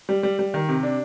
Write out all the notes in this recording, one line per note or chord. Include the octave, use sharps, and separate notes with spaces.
G3
G3
G3
D#3
C3
D4